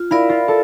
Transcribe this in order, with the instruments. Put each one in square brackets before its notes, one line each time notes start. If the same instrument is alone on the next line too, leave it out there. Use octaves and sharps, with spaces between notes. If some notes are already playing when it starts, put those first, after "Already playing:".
Already playing: [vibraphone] F4
[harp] E4 [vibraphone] A#4 D5 F5
[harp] F4
A4